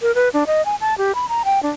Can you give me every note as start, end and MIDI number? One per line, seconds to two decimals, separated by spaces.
0.02 0.14 70
0.15 0.29 71
0.33 0.44 62
0.47 0.64 75
0.66 0.76 80
0.81 0.97 81
0.98 1.14 67
1.15 1.26 83
1.29 1.43 82
1.45 1.62 79
1.63 1.70 62